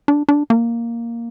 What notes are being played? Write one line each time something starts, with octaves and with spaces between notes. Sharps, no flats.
D4
D4
A#3